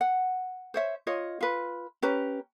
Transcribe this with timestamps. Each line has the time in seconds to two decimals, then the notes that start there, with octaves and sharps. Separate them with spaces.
0.01 F#5
0.74 C5 C#5 E5
1.07 F4 C#5 D#5
1.41 F4 B4
2.02 C#4 G4 B4 A#5